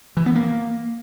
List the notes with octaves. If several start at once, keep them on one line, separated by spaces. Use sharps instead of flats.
E3
B3
A#3